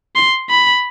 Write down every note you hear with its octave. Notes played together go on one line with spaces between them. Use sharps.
C6
B5